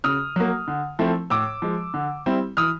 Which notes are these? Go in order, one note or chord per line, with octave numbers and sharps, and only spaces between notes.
C#3 D#6 F6
F#3 A#3
D3
F3 A3 C4 E4
A2 D6 E6
F3 G#3
D3
G3 C4 E4
E3 D#6 F6